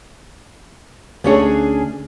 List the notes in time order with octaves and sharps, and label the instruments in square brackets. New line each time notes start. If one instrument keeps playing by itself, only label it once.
[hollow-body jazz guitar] D2 A3 C#5 [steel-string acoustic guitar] C#4 D4 G#4